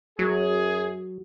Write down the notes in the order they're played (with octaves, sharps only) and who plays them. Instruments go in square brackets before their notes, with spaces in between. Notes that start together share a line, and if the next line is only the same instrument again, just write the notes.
[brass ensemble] F#2 G#4 [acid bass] F#3